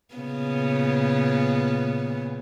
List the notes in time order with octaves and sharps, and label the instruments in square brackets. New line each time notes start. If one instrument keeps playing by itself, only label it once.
[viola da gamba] A#2 C#3 B3